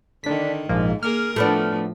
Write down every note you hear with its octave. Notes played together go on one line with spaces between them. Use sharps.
D3 D#3 D4 B6
A#1 G#2 F3 A#3
A#3 G#4 A#4 F6
A2 F3 A3 B3 D4